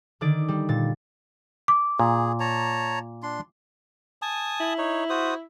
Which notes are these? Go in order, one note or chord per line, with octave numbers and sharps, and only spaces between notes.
D3 D#3 D5
G3
A#2 A6
D6
A#2 G#4
C#5 A5 A#5
D4 C6
G#5 A5 D#6
E4
D#4 C#5
F#4 C5 D#6